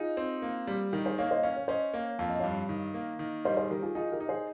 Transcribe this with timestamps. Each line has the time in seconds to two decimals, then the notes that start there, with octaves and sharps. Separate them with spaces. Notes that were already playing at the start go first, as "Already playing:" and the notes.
Already playing: D#4 F4 G#4
0.17 C4
0.42 A#3
0.67 G3
0.93 D#3 G4 A#4
1.05 G#4 C5
1.18 A#3 C#5 F5
1.30 C5 D#5
1.43 C#4 C#5 F5
1.57 C#5
1.68 C#4 C5 D#5
1.94 A#3
2.19 F2 F5
2.30 D#5
2.39 G2 C#5 F5
2.69 D#3
2.94 A#3
3.19 D#3
3.45 G3 C5 D#5
3.57 G#4 C5
3.70 D#3 G4 A#4
3.82 F4 G#4
3.95 D#4 F4 G#4
4.12 G4 A#4
4.21 D#4
4.29 G#4 C5